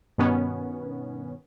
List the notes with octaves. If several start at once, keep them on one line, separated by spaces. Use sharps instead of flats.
G2 B2 D#3 B3 C#4